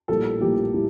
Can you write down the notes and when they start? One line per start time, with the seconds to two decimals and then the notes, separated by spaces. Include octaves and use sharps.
0.08 A#1 A2 G3 A#3 A4
0.41 A#1 A2 G3 A#3 G4
0.74 A2 G3